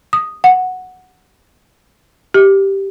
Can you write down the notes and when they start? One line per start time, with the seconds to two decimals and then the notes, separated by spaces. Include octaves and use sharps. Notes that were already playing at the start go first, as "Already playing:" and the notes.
0.13 D#6
0.44 F#5
2.34 G4